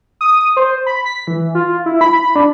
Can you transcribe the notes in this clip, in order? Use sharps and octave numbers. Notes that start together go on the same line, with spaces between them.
D#6
C5
B5
B6
E3
F4
E4
B5
D4